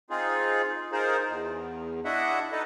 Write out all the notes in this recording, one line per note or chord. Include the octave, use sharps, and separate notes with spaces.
C4 D#4 F4 G#4
D#4 F4 G#4 A#4 C5
E2
D4 E4 F#4 D#5 E5 F#5
D#4 A4 B4 D#5